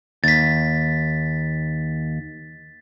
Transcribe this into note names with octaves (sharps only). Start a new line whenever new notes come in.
D#2 A6 B6